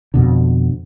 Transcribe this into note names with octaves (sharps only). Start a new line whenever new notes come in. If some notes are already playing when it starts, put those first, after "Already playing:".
F2 B2 D3